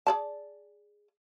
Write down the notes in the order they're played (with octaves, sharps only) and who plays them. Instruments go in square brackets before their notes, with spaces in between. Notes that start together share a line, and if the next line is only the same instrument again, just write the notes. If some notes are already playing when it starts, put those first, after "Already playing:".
[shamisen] G#4 D5 A5